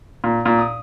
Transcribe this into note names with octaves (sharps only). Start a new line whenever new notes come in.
A#2
A#2
D#6